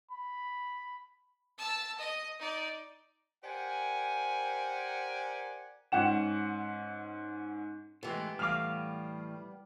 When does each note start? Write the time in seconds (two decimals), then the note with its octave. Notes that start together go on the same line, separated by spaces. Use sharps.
0.11 B5
1.58 A5 E6
1.98 D#5
2.39 D#4 D5
3.44 G4 A#4 C5 D5 F#5 G#5
5.92 G#2 C#4 F#5 E7
8.03 A2 E3 G#3 B3 G4
8.39 A2 E3 G3 F5 D6 F6